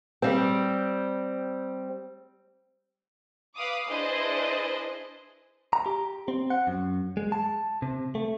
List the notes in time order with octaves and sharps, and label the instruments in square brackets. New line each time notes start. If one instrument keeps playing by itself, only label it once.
[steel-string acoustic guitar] G3 C4
[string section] B4 F5 D6 D#6
D4 E4 G#4 B4 C5 D#5
[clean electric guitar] A#5
G4
C4
F#5
F#2
G#3
A5
C3
A3